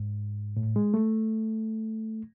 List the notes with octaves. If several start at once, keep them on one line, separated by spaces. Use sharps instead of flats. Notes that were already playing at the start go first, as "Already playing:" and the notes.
Already playing: G#2
A2
G#3
A3